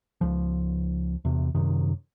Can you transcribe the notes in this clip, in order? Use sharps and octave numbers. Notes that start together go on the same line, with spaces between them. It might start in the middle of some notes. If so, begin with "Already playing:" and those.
C#2 F3
E2 C3
F#2 C3 D#3